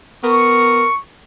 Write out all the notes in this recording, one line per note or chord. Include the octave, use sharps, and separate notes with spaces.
B3 A#4 C#6